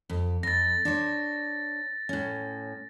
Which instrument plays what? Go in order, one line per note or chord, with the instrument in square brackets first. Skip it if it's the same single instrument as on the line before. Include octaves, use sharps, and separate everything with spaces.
[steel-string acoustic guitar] F2
[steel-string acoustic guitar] F2 [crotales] A6 A#6
[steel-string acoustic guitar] D4 C5 C#5
A2 C#4